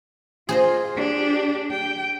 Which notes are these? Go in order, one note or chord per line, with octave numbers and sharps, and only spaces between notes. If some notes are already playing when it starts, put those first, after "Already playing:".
F4 G#4 C5 D#5
D4 G4
G5